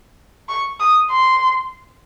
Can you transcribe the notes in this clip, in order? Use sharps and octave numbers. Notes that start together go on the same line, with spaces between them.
C#6
D#6
C6